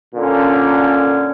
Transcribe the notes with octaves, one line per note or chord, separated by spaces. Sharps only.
A#2 D3 C#4